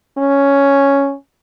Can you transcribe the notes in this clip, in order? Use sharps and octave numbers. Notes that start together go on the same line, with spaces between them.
C#4